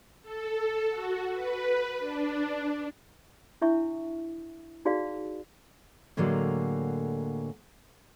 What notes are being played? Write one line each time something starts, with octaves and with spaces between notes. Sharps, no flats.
A4
F#4
B4
D4
D4 E4 E5 C#6
D#4 F#4 G#4 D5 F5
A2 D3 F#3 G#3 A#3